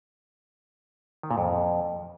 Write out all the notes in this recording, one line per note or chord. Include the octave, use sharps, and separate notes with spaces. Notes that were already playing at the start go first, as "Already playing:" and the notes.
D#3
A#2
F2